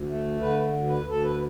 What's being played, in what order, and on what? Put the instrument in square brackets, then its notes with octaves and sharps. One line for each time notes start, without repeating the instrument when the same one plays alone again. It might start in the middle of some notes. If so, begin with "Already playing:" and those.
Already playing: [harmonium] D2
A3
D3 B4
D2
B4
D2
A4
B4